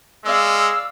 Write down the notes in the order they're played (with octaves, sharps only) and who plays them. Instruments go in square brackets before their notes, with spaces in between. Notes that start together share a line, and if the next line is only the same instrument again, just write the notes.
[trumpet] G#3 [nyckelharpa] D5 F5 [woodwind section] E6